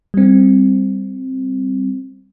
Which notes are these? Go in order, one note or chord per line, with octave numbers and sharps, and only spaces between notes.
G3 C4